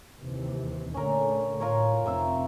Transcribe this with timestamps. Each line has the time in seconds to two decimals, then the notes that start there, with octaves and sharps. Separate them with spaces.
0.21 D#2 C3 E3
0.94 A#2 D3 A3 C#4 A#4
1.60 A2 F4 A#4 C#5
2.06 F1 C4 A#4 E5 F5